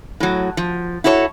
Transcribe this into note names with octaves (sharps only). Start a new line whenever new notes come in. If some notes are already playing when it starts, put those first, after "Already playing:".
A2 F#3
F3
E4 F#4 A4 C5 C#5